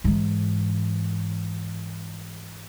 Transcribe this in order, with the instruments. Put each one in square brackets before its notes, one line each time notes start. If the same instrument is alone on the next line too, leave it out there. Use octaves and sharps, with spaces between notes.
[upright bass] G#2 E3